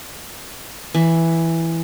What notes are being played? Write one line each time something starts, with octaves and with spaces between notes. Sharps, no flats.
E3